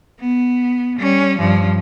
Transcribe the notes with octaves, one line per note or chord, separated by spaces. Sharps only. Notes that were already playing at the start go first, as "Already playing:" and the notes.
B3
G3 C#4
G2 F3